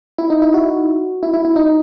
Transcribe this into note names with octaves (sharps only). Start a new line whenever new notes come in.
E4
D#4
E4
F#4
E4
E4
E4
D#4